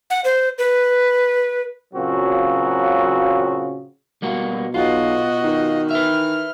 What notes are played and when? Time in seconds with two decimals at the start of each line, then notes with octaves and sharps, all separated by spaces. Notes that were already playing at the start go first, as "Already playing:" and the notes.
0.10 F#5
0.25 C5
0.58 B4
1.94 A#2 C#3 F#3 C4 F#4
4.22 B2 G3 A#3 F#4
4.74 B1 F4 F#4 D#5
5.44 D#3
5.91 B4 E5 F6